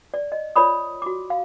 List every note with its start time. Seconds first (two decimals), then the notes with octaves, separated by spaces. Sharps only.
0.14 D5
0.32 D#5
0.56 F4 A#4 C#5 D5 B5 D#6
1.02 F#4 D6
1.30 F5